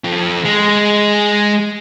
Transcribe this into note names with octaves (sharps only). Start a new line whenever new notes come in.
F2
G#3